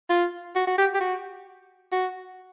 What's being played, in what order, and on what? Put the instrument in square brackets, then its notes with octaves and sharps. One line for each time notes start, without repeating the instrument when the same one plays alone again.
[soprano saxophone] F4
F#4
F#4
G4
G4
F#4
F#4